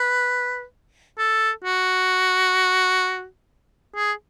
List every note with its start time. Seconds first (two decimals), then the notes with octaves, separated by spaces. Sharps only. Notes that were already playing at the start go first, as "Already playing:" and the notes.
Already playing: B4
1.18 A4
1.64 F#4
3.95 G#4